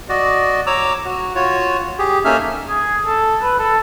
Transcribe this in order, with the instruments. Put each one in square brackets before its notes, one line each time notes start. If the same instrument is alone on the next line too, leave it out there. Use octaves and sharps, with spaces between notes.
[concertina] F#4 D5 D#5
C#5 A#5 D6 E6
F#4
F4 F#4 C#5
G4 G#4
A#3 C#4 D#4 A4 E5 F6
[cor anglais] G#4
A4
B4
A4